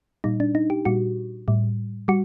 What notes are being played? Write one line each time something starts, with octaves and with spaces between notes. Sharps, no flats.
A#2 G3 D#4
D4
D#4
G4
A#2 G3 F#4
A2 G3
G3 F#4